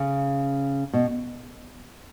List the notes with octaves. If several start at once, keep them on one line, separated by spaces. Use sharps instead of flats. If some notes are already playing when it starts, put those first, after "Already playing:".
Already playing: C#3
B2